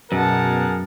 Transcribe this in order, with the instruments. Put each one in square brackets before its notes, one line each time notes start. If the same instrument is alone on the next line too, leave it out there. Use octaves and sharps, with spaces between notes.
[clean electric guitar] F#2 [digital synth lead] B2 [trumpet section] G#4 A#4 [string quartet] F#5 A5